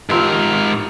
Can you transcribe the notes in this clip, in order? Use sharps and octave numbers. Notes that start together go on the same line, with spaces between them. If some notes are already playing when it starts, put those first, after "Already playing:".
G#2 F3 C4 G4 A#4